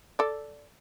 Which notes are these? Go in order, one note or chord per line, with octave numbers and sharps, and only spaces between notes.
A4 D5